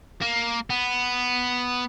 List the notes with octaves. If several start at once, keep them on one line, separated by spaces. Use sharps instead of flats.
A#3
B3